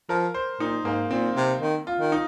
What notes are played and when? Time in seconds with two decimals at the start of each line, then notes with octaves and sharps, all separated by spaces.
0.09 F3 A#4
0.34 C5
0.60 A#2 D#4
0.85 G#2 A#3
1.11 A#2 C4
1.36 C3
1.61 D#3
1.87 F4
2.00 D#3
2.12 D#4